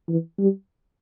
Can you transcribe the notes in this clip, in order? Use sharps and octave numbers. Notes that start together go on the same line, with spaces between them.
E3
G3